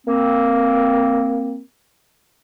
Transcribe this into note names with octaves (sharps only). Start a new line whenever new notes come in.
A#3 C4